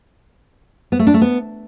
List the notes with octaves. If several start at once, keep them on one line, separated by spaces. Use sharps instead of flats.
B3
A3
D4
A3
B3